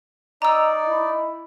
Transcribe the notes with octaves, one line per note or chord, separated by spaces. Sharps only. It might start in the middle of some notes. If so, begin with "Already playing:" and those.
D#4 D5 D#5 A#5 E6
E4